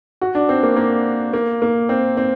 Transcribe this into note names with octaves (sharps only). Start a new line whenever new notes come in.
F#4
D4
C4
A#3
A#3
A#3
A#3
C4
C4